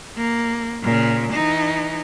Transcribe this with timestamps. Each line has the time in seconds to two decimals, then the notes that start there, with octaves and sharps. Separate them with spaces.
0.17 A#3
0.82 A#2 C#3
1.32 E3 D#4